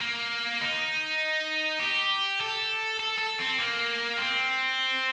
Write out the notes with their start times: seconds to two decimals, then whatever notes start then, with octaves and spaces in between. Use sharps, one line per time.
0.01 A#3
0.61 D#4
1.80 G4
2.40 A4
3.00 A4
3.19 A4
3.39 C4
3.59 A#3
4.18 C4